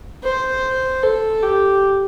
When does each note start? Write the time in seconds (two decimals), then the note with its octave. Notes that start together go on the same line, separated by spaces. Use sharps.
0.23 C5
1.03 A4
1.43 G4